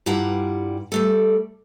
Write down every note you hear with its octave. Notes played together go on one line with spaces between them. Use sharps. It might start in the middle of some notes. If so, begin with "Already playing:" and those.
G2 G3 E4 F4 F#5 A#5
G3 A3 A4